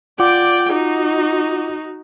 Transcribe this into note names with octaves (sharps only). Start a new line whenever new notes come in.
F4 D5 F#5 G5 D6
D#4 F#4